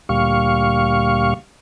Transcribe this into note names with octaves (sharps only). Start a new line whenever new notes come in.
D2 A#2 G3 F5 C#6